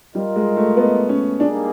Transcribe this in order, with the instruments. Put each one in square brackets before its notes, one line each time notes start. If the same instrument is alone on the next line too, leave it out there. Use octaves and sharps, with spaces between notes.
[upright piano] G3 [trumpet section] F4 A#4 D#5
[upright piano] G#3
A3
B3
C#4
[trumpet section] G3 A#3 D#4 G#4 [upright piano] D4